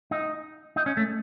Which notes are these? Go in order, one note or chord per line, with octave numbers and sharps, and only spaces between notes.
D#4
D#4
C#4
A3